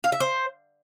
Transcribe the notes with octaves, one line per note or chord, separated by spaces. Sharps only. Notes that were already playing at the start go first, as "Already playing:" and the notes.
F5
E5
C5